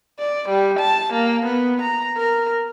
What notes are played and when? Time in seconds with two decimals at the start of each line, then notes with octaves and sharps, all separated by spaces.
0.19 D5
0.49 G3
0.79 A5
1.13 A#3
1.45 B3
1.82 A#5
2.17 A#4